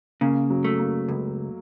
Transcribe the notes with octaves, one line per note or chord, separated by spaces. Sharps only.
C#3 A#3
F#3
A3
A#3
C#2